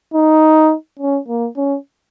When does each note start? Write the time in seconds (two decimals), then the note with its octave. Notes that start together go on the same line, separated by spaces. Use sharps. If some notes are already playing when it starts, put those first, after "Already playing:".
0.14 D#4
1.00 C#4
1.28 A#3
1.57 C#4